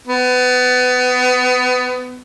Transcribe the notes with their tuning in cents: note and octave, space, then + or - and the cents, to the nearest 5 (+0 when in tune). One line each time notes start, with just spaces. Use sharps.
B3 +25